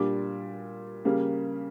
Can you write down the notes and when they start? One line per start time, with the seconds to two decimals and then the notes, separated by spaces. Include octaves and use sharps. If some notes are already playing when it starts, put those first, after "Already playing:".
Already playing: A#2 G3 D4 D6
1.05 C#3 G3 A#3